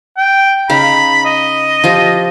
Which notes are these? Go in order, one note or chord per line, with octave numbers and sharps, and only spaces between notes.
G5
C#3 D#4 F5 B5
D#5
F3 F4 G4